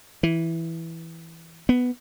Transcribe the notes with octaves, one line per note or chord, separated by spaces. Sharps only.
E3
B3